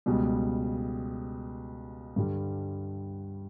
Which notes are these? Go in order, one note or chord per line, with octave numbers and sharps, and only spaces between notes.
C#2 B2 G3
G2 D3 G3